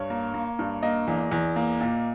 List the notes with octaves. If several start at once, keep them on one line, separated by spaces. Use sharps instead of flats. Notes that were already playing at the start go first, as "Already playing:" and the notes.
Already playing: G2 C#5
A#3
A#3
G2
A#3 D#5
E2
E2
A#3
A#2